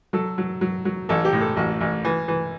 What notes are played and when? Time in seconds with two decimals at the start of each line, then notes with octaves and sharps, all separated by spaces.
0.13 F#3 A4
0.38 F#3
0.61 F#3
0.85 F#3
1.09 A1 A4
1.25 G4
1.32 A2
1.41 A4
1.56 A1 F#4
1.81 A1
2.05 E3
2.28 E3